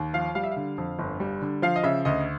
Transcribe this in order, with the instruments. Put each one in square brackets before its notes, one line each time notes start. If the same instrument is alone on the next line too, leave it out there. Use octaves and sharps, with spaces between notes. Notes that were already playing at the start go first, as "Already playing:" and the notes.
Already playing: [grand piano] D#2
F3 F5
G3 F5
E5
F5
D3
F2
G1
G3
D3
F3 F5
D#5
C#3 E5
D2 D#5